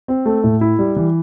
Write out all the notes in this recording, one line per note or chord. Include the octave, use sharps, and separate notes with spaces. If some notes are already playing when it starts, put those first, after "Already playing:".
C4
A3
A2
E4
G3
E3